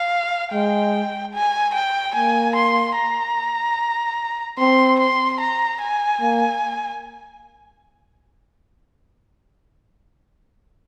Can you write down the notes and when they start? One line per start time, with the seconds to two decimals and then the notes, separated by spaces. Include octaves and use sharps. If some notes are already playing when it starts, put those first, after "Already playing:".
Already playing: F5
0.52 G#3 G5
1.34 G#5
1.74 G5
2.15 A#3 G#5
2.56 C6
2.96 A#5
4.59 C4 C6
4.99 C6
5.41 A#5
5.81 G#5
6.21 A#3